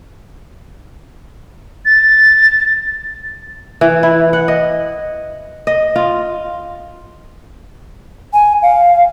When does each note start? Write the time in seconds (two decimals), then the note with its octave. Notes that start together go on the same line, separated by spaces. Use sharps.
1.86 A6
3.81 E3
4.03 E4
4.33 F#5
4.48 D#5
5.67 D#5
5.96 F4
8.34 G#5
8.63 F5